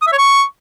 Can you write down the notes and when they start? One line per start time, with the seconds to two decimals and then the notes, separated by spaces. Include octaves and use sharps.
0.02 D#6
0.07 E5
0.13 C#5
0.18 C#6